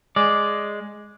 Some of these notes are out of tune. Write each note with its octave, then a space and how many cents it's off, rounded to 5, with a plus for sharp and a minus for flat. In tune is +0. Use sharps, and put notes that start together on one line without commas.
G#3 +0 D5 +0